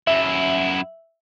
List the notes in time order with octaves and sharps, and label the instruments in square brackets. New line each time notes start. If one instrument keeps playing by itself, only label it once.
[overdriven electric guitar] F#2 E4 [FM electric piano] E5